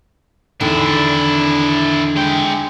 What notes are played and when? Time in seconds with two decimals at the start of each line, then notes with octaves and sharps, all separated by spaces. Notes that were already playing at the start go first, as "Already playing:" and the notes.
0.61 E2 D3 D#3 D4 E4
2.16 G#3 G5